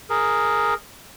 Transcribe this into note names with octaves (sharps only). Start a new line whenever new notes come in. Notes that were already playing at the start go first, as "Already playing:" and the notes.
G#4 A#4